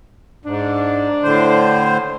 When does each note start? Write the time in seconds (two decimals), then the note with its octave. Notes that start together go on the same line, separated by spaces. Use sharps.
0.46 G#2 D4
1.23 A2 D3 C5